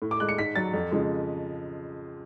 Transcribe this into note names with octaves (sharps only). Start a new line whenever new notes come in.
A2
D6
G#3 F#6
C#7
G#2 B6
F#3 A6
F2
C#3 F3 G#3